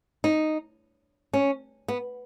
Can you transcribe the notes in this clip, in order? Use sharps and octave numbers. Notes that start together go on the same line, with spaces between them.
D#4
C#4
B3